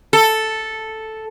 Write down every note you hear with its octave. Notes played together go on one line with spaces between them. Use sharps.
A4